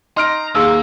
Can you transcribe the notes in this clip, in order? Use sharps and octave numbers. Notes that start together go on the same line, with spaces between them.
D#4 A#5 C6 F6 D7
D#2 A#3 G#4 E6